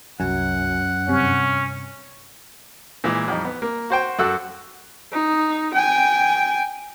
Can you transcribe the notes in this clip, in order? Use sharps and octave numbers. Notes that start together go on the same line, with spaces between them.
C2 F#2 F#4 F#5 G#5
G2 C3 C#4
A#2 E3 G#3
F2 G3 D#4
B3
A#3
F#4 C5 G5
F#2 F#4 A4 E6 F#6
D#4
G5 G#5